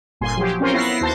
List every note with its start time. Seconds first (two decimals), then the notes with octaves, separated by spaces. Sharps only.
0.21 G1 A#2 G#5 C6
0.37 F3 F#3 G4
0.60 C4 C#4 F4 A#4 C5 C#5
0.73 B3 E4 A#6 C7
1.01 D#2 F#4 C5 A5